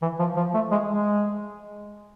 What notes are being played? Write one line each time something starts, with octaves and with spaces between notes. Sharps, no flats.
E3
F3
F3
A3
G#3
G#3